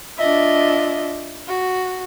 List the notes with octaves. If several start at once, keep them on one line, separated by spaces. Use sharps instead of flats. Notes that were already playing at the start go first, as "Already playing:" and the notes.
D4 F4 D#5 E5
F#4